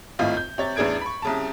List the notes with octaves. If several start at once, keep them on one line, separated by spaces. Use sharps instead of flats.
G#1 A2 F4 D#5 F5
G6
C3 C#5 A6
A1 E2 D4 G#4 G#6 D7
B5 C#6
C2 C#3 A5